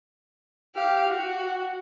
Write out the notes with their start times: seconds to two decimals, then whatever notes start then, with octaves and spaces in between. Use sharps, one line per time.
0.76 G4 F5
1.09 F#4